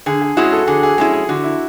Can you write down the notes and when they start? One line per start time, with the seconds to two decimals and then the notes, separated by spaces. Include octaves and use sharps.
0.06 D3 G#4
0.21 G#4
0.37 G#3 C#4 E4 F#4
0.52 A4
0.67 D3 G#4
0.83 G#4
0.98 G#3 C#4 E4 G#4
1.13 G#4
1.29 D3 F#4
1.44 E4